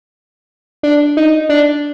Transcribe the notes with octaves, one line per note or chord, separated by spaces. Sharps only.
D4
D#4
D4